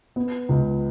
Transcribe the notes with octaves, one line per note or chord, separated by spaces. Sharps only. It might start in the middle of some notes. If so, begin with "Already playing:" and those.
B3
C#2